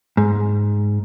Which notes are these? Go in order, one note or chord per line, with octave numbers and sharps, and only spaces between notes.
G#2